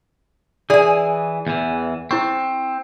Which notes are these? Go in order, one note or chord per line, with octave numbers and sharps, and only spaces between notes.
E3 G#4 D5 G#5
E2 E3
C4 E4 C5 C#6